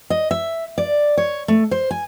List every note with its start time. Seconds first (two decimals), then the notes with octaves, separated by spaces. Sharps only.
0.10 D#5
0.31 E5
0.78 D5
1.17 C#5
1.48 A3
1.71 C5
1.91 G#5